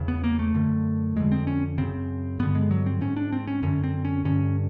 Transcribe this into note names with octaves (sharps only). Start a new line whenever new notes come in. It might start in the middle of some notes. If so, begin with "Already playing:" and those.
Already playing: E2 C#3
B3
A#3
A3
F#2 D3
F2 D3 G#3
C4
C#4
F#2 C#3 C4
G2 D3 B3
G#3
F#3
C4
G#2 C#4
D4
C4
C#4
F#2 D3 C#4
C4
C#4
G2 D3 C#4